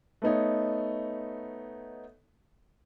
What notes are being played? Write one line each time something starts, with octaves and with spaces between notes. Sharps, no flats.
A3 B3 D#4 C#5